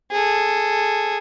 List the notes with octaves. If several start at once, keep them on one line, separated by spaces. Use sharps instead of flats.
G#4 A4